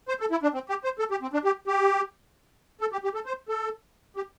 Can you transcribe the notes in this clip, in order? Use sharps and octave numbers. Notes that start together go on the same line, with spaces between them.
C5
A4
E4
D4
C4
G4
C5
A4
G4
C4
D4
G4
G4
A4
G4
G4
A4
C5
A4
G4